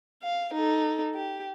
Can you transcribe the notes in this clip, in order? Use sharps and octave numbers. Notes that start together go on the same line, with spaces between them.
F5
D#4 A4
G4